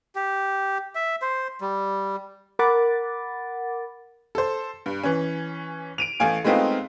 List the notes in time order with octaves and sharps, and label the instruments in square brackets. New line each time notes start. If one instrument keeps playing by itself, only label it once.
[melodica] G4
E5
C5
G3
[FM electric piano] A#4 F#5 B5 D6 A6
[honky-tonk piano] A4 C5
G2
E3 C#4
D7 D#7 F7
A1 A3 F5 G#5 D7
G#3 A3 B3 C4 D#4 F4